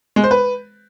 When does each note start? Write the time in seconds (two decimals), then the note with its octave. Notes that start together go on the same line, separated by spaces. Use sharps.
0.16 G#3
0.24 C5
0.31 B4